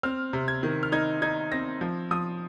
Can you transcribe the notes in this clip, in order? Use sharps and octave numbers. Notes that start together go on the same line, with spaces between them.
C4 F6
C3
G#6
D#3
F6
D#4 G#6
D#4 G#6
C4 A#6
F3
F3 D#6